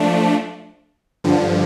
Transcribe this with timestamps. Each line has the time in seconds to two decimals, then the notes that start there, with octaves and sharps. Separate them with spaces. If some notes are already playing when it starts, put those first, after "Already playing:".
Already playing: F3 A3 D4
1.24 G2 D3 F3